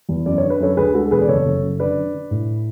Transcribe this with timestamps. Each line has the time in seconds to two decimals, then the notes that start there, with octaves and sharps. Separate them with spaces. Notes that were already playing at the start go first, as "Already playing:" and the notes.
0.09 E2
0.26 F#2 D5
0.38 D3 C#5
0.50 B4
0.60 F#2 A4 C#5
0.77 D2 G#4 B4
0.94 G#3 F#4 A4
1.07 A4
1.11 E1 G#4 B4
1.21 D5
1.28 F#1 A4 C#5
1.46 F#1
1.63 F#2
1.79 D3 B4 D5
1.97 D3
2.14 D3
2.31 A2